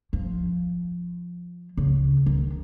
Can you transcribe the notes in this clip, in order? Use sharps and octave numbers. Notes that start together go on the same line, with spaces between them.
F3
C#2 C#3
D#3